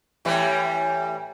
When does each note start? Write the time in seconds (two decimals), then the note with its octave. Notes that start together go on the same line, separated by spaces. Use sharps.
0.25 A2 E3 G3